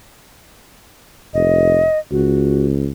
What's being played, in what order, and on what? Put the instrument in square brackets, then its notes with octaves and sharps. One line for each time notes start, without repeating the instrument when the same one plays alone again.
[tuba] F1 [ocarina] D#5
[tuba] C#2 [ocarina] F#4